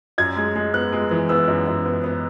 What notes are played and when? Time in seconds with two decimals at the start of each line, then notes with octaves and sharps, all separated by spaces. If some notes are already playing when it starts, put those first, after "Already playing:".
0.18 F#2 G#6
0.37 G#3
0.55 G#3
0.74 B3 F#6
0.93 G#3
1.11 E3
1.29 B3 E6
1.48 F#2
1.67 F#2
1.86 B3
2.04 B3